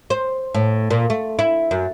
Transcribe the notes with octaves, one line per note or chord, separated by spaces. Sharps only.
C5
A2
A#2
A3
E4
F#2